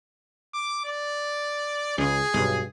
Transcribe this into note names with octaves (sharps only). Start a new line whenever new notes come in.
D6
D5
C#2 G#4
B1 G2